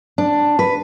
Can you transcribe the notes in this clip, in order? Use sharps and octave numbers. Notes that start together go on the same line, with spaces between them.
D4
B4